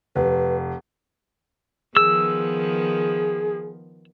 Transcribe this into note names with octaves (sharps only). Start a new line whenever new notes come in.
F1 B4
D#3 F3 B3 G#4 E6